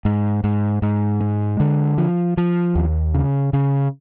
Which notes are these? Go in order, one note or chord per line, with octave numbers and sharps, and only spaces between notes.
G#2
G#2
G#2
G#3
D3
F3
F3
D#2
C#3
C#3